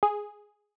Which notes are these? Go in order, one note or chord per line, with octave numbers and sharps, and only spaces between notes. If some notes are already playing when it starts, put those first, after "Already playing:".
G#4